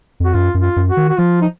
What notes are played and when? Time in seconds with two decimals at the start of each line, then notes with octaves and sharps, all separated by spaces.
0.20 F2 F#4
0.34 F#2 F4
0.54 F#2
0.61 F4
0.76 F#2
0.90 F#4
0.97 D#3
1.09 F#4
1.18 F3 F4
1.42 D#4